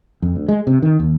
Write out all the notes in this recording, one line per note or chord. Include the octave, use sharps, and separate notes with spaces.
F2
D2
G#3
C3
D#3
D#2